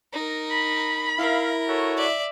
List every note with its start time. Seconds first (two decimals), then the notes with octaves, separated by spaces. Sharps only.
0.13 D#4 A#4
0.50 B5
1.19 E4 A#4 E5 F5
1.67 F#4 A4 C#5
1.97 D5 E5